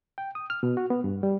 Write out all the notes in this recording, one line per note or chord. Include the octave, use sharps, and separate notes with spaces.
G5
D#6
F6
B2
F#4
B3
G2
G3